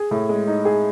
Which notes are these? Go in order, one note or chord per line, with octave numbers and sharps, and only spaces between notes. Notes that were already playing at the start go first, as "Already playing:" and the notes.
Already playing: G#4
A2
G#3
D#4
G#4